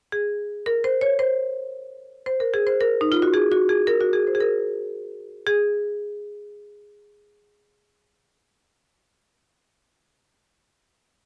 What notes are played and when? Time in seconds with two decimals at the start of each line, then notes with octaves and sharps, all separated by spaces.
0.12 G#4
0.66 A#4
0.84 C5
1.01 C#5
1.19 C5
2.26 C5
2.40 A#4
2.54 G#4
2.67 C5
2.81 A#4
3.01 D#4
3.12 F4
3.22 F#4
3.34 G#4
3.52 F#4
3.69 G#4
3.87 A#4
4.01 F#4
4.13 G#4
4.27 C5
4.35 G#4
4.40 A#4
5.47 G#4